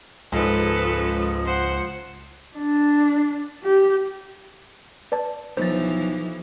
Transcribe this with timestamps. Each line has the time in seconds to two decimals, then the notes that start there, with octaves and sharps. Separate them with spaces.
0.32 C#2 G#2 F3 A4 B4
1.45 C5 F#5
2.57 D4
3.64 G4
5.12 B4 D5 A5
5.57 B1 E3 F3 C5 A6